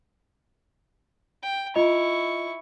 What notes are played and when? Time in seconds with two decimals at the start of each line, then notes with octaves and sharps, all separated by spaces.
1.43 G5
1.75 E4 F4 D#5 C#6 F7